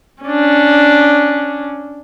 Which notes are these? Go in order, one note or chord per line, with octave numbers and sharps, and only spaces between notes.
C#4 D4